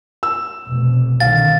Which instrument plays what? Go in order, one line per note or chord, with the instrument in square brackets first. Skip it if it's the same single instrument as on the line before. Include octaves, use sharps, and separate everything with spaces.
[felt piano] E6
[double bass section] F1 B2
[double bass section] C2 D3 D#3 [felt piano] F5 [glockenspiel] A6